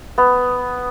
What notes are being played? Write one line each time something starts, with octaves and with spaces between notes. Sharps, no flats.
B3